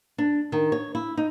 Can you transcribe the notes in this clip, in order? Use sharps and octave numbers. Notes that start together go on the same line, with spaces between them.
D4
D#3
C#5
E4
D#4